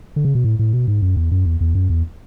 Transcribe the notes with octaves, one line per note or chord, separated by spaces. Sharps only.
D3
C#3
B2
A2
A2
B2
G#2
F#2
E2
F#2
E2
E2
F#2
E2